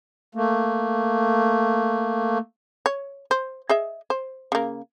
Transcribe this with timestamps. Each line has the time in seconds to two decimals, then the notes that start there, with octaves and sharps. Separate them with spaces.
0.35 A3 A#3
2.86 C#5
3.31 C5
3.69 G#4 D#5 E5
4.10 C5
4.52 C#3 A#3